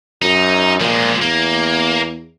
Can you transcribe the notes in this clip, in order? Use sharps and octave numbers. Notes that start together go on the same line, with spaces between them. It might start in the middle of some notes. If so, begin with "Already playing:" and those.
F#2 D#4
A#2 F3 G#3
E2 A#3